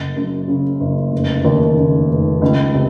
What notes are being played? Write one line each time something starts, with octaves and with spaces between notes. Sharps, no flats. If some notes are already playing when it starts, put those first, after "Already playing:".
Already playing: F#1
F#2
C#3
F#1
F1
D#2
C#3
F1
C#2
C3